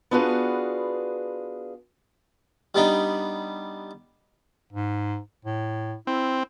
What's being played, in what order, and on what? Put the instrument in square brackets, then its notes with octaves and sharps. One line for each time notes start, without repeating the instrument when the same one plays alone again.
[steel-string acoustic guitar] B3 D4 F4 F#4 G#4 B4
[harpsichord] G3 B3 D4 D#4
[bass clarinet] G#2
A2
[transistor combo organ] C4 [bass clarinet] E4